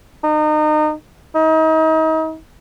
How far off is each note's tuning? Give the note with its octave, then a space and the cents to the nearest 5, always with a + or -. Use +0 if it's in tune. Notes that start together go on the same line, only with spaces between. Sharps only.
D#4 -30
D#4 +35